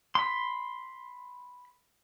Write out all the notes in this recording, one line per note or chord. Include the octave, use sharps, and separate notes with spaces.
B5 C6